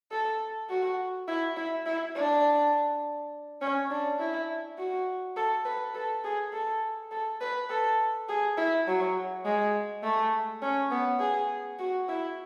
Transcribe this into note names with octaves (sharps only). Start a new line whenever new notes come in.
A4
F#4
E4
E4
E4
D4
C#4
D4
E4
F#4
A4
B4
A4
G#4
A4
A4
B4
A4
G#4
E4
F#3
G#3
A3
C#4
B3
G#4
F#4
E4